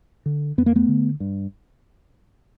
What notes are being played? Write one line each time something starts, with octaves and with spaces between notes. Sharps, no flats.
D3
F2 B3
A#3
A3 B3
D3
G2